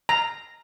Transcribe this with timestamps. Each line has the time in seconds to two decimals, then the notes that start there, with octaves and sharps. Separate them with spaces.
0.09 A#5